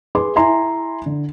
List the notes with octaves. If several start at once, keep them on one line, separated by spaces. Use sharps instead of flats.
G#4 B4 C6 D6
E4 E5 G#5 A#5 C6
D3